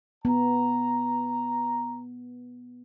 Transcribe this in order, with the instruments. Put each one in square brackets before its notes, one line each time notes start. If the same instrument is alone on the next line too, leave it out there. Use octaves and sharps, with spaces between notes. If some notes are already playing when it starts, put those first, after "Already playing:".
[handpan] B3 [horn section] A#5